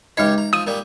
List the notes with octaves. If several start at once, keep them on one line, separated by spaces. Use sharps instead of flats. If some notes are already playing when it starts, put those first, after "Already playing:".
C#2 G#3 D#4 G4 C#5 D#5
A#5
F3 D#6 D#7
A#2 G3